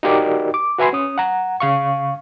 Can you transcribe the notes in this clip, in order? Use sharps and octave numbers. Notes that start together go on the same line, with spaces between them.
D#4 F#4 G4 A#4 D5 D#5
D6
F#4 B4 E5 G#5 B5 C6
C#4 D#6
F#5 A#5
C#3 F5 C#6